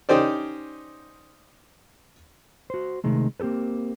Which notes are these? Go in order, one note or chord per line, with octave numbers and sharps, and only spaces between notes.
C#4 D#4 G4 C5 D5
F#4 C5
C3 D#3 G#3 A3
A#3 C4 G4 A4 B4